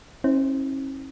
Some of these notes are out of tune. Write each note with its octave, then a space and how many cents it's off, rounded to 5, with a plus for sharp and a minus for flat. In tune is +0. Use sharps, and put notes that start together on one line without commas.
C#4 -45 E4 -40 C5 +0